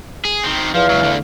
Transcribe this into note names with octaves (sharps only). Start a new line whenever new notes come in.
G#4
D#3 C4
E2 F3 F5
C#2 F#3
D2 D3